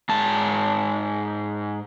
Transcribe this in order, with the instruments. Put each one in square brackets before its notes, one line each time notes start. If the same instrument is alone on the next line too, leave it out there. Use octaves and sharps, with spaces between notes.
[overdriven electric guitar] G#2 A5